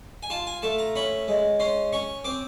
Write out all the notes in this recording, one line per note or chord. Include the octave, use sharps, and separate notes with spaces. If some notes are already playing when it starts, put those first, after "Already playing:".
G#5
F4 A5
G#5
A3 A5
A#5
C#4 B5
G#3
C#4 C6
C#4 C#6
C4 D6